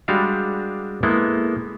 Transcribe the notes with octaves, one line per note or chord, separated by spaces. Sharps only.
G3 G#3 D4 F#4 G4 F5
G#3 A#3 B3 E4 A4